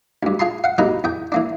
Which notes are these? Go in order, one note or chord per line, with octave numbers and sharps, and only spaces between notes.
D2 G2
F4 G#4 A5 C6
F5 F#5
C3 F#3 A#3 D#4 A#4 B4
E2 G#4 G5
E3 A#3 D4